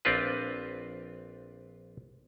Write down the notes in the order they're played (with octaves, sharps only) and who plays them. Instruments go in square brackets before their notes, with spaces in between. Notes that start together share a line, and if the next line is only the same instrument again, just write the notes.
[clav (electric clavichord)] A#1 C4 D4 F4 B4